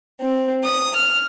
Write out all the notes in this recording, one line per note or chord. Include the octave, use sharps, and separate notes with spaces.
C4
D#6
F6